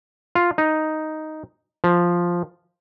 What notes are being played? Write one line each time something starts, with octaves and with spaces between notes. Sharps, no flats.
F4
D#4
F3